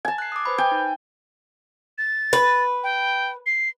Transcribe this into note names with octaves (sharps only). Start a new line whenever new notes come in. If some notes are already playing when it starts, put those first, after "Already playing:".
G#5 A5
F#6 C7
D6 D#6
B4 C5 B5
G5 G#5
D#4
A6
B4
G5
C7